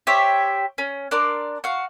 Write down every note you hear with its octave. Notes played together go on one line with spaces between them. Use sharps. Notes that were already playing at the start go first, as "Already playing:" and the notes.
G4 C5 C#5 E5
C#4
D4 A#4 D5 C6
F#4 F5